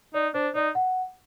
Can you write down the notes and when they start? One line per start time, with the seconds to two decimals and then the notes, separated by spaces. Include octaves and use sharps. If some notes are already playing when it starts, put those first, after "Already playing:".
0.14 D#4 D5
0.34 D4 C5
0.55 D#4 D5
0.75 F#5